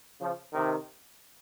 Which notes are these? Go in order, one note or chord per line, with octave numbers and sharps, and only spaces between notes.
C#3 F3
C3 D#3